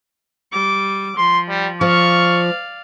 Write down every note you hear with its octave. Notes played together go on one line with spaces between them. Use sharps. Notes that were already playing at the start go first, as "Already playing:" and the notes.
G3 D6
F3 C6
G3
F3 D5 F5 C#6